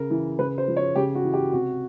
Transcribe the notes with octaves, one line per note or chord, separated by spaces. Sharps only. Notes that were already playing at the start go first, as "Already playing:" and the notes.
Already playing: C#3 A#4
E3
C#3 B4
C5
F3
C#5
C#3 G4
F#4
E3
G4
C3 F#4